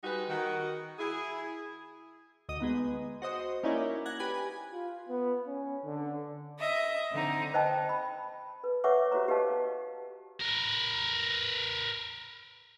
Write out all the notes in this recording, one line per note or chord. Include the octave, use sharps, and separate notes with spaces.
G3 G#3 D#4 F#4 B4
D#3 F#4
E4 G#4
D2 D#5 D#7
G#3 B3 D#4
F#4 C5 D#5
A#3 C#4 D#4 E4 C#5 D5
F#5 F#6 G#6 A#6
G4 B4 G#5 G#6
F4
B3
C#4
D3
D#5 E5
D3 C4 D#4
C5 D#5 G5 A5
B5
B4
B4 C#5 E5 F#5 C#6 D6
F#4 G4 C5 C#5 A#5 D6
G4 B4 D#5 F5 A5
A#4 B4